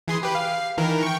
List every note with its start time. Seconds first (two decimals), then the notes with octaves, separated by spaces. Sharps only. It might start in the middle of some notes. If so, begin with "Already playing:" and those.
0.08 E3 G#4 C6
0.23 G4 B4
0.35 F5
0.77 D#3 E3 A#4
1.03 G5 C#6